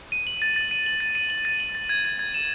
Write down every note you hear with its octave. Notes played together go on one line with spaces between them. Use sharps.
D#7
F#7
A6
A6
D#7
F#7
A6
D#7
F#7
A6
F#7
A6
G#6
G#6
G#6
E7